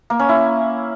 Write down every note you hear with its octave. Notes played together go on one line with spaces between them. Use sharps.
A#3
C#4
E4